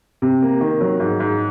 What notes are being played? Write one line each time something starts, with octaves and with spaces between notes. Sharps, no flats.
C3
A#3
D#3
F#3
G#2
G#2